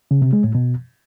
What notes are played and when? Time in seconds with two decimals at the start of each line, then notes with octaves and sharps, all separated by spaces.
0.11 C#3
0.22 C3
0.33 G#3
0.44 A2
0.55 B2